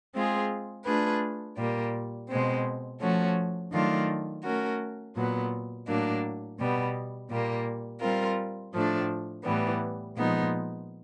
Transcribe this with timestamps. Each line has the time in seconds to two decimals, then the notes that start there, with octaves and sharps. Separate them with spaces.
0.15 G#3 C4 F4 G#4
0.85 A3 D4 F4 G#4 B4
1.57 A#2 G3 A#3
2.29 B2 G#3 C4
3.01 F3 A3 C#4 F#4
3.72 D#3 F#3 A3 D4 F4
4.43 A3 C#4 F#4 A#4
5.15 A#2 F#3 B3
5.87 A2 F#3 A#3 D4
6.58 B2 G3 B3
7.30 A#2 G3 A#3
8.01 G3 C4 F4 A#4
8.73 A2 F3 A3 D4
9.44 A2 E3 G3 B3
10.17 A#2 F3 G#3 B3 D#4